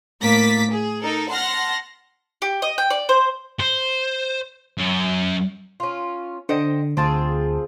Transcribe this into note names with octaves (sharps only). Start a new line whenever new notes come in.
A2 A#3 D6 A6 B6
G#4
D#4 A4 A#4
F#5 A5 C6 F6 A#6
G4
D#5
G5
D5
C5
C5
F#2
C#4 F4
D3 C5 D#5 G5
D2 C4 F4 G#4 A5